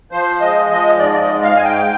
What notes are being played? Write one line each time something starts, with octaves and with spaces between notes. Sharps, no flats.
F3 C5
G#3 D#5
F3 D#5
G#2 D5
D5
D#5
G#3
F5
G#2 G#5
G5